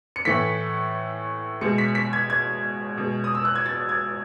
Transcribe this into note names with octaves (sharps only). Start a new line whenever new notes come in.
C#7
A2 E3 A3 B6
B2 G#3 C#7
B6
B6
G#6
G#6
B2 G#3
D#6
E6
F#6
G#6
A6
G#6